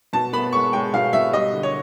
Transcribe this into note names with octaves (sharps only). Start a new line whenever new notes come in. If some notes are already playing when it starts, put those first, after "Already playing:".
B2 A5
B3 B5
G#3 C#6
G#3 G5
B2 F5
B2 E5
G3 D#5
D3
C#5